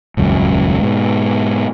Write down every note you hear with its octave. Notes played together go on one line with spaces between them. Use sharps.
D#1 C#2 F#2
G#2 B2